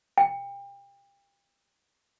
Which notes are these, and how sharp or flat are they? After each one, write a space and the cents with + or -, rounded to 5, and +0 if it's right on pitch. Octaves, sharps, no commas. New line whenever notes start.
G5 +30